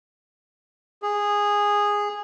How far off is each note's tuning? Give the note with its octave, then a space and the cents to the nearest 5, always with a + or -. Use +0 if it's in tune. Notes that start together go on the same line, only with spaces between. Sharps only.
G#4 -10